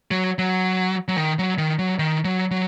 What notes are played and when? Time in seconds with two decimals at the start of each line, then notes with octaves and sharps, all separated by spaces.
0.11 F#3
0.38 F#3
1.08 F#3
1.18 D#3
1.39 F#3
1.58 D#3
1.79 F#3
1.99 D#3
2.25 F#3
2.51 F#3